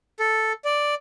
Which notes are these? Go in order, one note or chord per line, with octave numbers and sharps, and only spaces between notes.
A4
D5